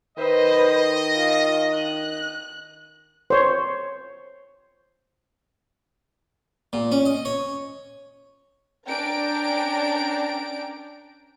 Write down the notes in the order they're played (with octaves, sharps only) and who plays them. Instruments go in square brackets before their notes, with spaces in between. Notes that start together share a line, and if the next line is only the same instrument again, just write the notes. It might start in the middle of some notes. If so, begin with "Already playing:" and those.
[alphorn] D#3 [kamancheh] B4 C5 [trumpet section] D#5
[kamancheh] F4
F#6
[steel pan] C5 C#5
[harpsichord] A#2
C#4
D#5
C#5
[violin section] C#4 D4 G5 A#5 D7